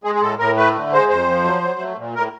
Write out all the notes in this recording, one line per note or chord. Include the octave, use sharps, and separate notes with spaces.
G#3 G#4
G#4
A2 A4
A2 A#4
A3 B4
D3
G#3 C5
F2 C5
F3
F#3
F#3
A3
A#2
A2 A#4